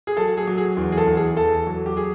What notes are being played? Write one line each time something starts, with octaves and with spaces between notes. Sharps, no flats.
G#4
F#3 A4
G#4
F#3
G#4
E2
G#4
A4
E2
G#4
E2 A4
F#3
G4
G#4